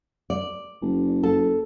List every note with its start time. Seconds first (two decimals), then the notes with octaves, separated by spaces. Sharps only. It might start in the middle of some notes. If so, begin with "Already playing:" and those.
0.30 D5
0.82 F#1
1.23 A4